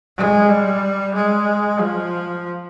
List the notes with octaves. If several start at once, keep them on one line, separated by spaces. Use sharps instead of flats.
G#3
G3
G#3
F3